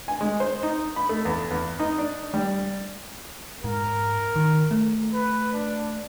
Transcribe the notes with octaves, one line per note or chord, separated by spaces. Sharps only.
G#5
G#3
C5
D#4
B5
A3
E2
E2
D#4
D4
G3
G#2 A#4
D#3
A3
B4
D4